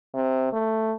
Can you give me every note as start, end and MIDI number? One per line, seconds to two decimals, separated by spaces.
0.14 0.50 48
0.52 0.93 57